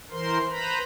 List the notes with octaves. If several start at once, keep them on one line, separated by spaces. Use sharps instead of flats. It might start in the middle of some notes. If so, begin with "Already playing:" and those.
E3 A#4 C5 C6
B4 C5 A#5 B5